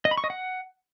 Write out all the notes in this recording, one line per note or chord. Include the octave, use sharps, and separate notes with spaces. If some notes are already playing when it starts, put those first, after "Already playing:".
D#5
B5
C#6
D#5
F#5